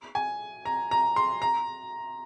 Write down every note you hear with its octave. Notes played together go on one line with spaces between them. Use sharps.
G#5
A#5
A#5
C6
A#5